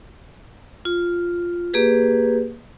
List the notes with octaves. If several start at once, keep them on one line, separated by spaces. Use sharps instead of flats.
F4
A#3 G4 G#4 B4